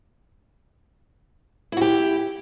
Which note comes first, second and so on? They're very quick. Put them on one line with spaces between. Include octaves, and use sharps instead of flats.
E4 F#4 G4